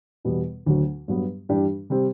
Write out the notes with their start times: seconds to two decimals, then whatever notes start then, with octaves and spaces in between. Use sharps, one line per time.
0.24 E2 B2 G3 B3
0.66 D2 D3 F#3
1.08 G2 F#3 B3
1.49 G2 E3 G3 D4 G4
1.90 C3 G3 C4